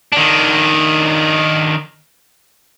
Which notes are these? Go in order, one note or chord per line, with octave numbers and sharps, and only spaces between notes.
D#3 D4